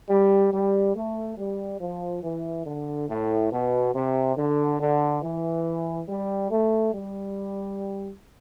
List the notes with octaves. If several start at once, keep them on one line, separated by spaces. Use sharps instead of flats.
G3
G3
A3
G3
F3
E3
D3
A2
B2
C3
D3
D3
E3
G3
A3
G3